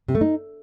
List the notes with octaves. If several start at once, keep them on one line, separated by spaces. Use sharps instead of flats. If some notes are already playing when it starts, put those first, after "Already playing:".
C3
A3
D#4